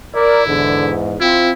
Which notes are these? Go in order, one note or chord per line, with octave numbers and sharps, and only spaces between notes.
E4 A#4 D5
E2 G#2 D3
C4 E4 F4